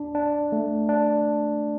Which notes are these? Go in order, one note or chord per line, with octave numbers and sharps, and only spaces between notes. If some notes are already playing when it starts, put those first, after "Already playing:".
Already playing: D4
D4
A3
D4